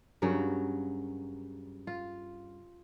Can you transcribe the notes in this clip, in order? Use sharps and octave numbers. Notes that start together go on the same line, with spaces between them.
G2 C#3 F#3 A#4
F4